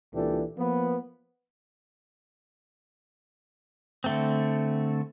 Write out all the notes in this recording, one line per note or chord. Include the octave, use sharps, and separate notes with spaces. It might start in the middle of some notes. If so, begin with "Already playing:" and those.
C#2 A#2 E3 D4 G4 A4
F3 A#3 B3
D3 A3 C4